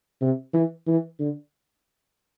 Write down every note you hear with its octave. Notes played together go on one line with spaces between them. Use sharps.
C3
E3
E3
D3